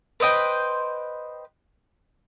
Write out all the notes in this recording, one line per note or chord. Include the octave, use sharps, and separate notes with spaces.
B4 C5 D#5 G5